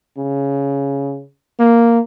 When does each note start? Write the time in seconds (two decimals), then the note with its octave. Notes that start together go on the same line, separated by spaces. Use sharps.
0.18 C#3
1.59 A#3